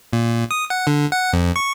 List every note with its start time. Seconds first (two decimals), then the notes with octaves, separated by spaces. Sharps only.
0.13 A#2
0.51 D#6
0.70 F#5
0.87 D3
1.12 F#5
1.33 F2
1.56 C#6